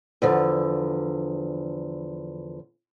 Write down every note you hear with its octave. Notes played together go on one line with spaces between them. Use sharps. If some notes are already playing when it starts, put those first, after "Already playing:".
E2 D3 F3